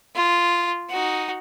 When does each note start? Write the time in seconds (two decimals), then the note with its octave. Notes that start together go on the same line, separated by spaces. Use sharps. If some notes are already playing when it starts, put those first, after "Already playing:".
0.16 F4
0.89 D#4 F#4